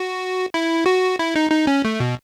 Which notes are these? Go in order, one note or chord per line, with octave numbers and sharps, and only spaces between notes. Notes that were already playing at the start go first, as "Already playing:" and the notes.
Already playing: F#4
E4
F#4
E4
D#4
D#4
C#4
A3
B2